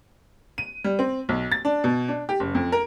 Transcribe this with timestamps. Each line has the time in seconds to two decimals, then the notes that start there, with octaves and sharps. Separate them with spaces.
0.58 D#7
0.84 G3
0.99 C4
1.29 B1
1.52 A6
1.65 D4
1.84 B2
2.08 D4
2.29 G4
2.40 F#1
2.55 F2
2.72 A#4